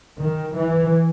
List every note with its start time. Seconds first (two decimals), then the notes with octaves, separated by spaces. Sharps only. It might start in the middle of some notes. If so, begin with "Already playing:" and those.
0.18 D#3
0.56 E3